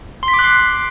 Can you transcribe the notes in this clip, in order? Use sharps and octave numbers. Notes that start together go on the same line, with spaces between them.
C6
B6
D6
F#6
C7